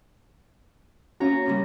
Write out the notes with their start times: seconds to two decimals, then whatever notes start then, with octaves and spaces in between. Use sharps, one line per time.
1.20 A#3 C#4 F#4 C#5 A#5
1.46 A#2 C#3 G3